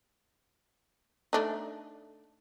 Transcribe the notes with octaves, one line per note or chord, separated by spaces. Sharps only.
A3 D4 D#4